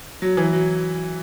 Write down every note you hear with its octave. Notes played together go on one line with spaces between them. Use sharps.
F#3
E3
F#3